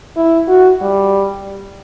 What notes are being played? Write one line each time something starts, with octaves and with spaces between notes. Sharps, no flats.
E4
F#4
G3